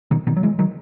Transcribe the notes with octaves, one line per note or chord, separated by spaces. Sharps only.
B2 D#3
B2 D#3
F#3
E3 G#3
D#3 F#3